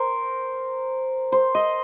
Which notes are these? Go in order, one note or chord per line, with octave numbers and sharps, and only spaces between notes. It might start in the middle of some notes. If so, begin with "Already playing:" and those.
Already playing: A#4 C5
C5
D#5